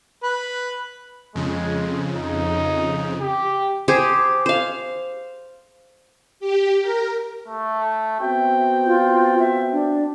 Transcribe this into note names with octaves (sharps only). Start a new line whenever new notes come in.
B4
F2 C#3 G#3
D#4
G4
G4 G#4 C5
C5 F5
G4
A#4
A3
B3 C4 F#4 E5 G5
F4
E5
D4